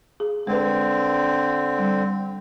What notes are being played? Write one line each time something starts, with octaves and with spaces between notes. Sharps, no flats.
G#4
D3 G#3 C4 B4
G3